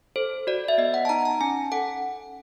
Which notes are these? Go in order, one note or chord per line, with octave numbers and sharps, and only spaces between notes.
A4 C5
F#4 D5
E5
B3 D#5
F#5
A5
D#4 A#5
A5
C#4 G#5
A4 F#5